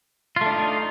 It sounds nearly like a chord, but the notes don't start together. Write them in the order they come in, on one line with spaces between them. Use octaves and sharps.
F4 A3 D4 D#4